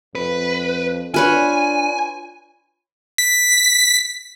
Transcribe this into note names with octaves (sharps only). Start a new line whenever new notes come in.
F2 B4
D4 F4 B4 C#5 G#5
B6